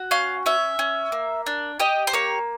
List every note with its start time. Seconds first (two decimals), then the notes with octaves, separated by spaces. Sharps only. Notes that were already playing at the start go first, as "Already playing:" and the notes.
Already playing: F#4
0.11 C#4 F5
0.46 C#4 E5
0.79 C#4
1.12 A#3
1.46 D4
1.80 G4 D#5
2.07 C5
2.13 A#3 C#5